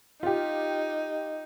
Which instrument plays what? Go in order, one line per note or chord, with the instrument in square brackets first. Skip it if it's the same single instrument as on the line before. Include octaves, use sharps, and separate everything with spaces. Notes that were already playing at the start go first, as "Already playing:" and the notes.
[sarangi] D#4 [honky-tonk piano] F4 G4